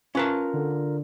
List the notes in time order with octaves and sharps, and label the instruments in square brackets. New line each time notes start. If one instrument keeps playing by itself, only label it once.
[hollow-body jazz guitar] C#4 B4 A5 [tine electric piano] F4 A#4
[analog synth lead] D3